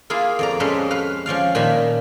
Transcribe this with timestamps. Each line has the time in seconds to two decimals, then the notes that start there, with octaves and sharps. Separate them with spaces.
0.10 A#3 E4 F4 G#4
0.39 F2 D5 A#5
0.60 G#3 C#4 G4 A4 B4 C5
0.91 B4 F5
1.26 F3 C#4 D5 F5
1.55 A#2 D#3 G#5 A5 B5